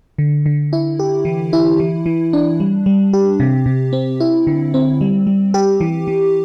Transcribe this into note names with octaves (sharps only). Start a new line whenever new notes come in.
D3
D3
E4
G4
E3
E4
E3
E3
D4
G3
G3
G4
C3
C3
C4
E4
D3
C4
G3
G3
G4
E3
E3